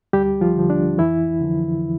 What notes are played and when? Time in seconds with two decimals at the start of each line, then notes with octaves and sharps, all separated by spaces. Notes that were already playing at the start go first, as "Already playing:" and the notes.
0.13 D2 G3 G4
0.41 F3 F4
0.56 D3 F3
0.70 D4
0.98 F2 E3 E4
1.41 D3 F3